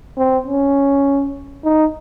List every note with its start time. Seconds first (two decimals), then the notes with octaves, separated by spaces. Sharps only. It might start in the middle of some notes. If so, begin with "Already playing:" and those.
0.17 C4
0.46 C#4
1.64 D#4